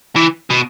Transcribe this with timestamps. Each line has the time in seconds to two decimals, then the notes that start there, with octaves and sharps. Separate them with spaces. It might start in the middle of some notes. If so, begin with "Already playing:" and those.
0.16 E3
0.50 B2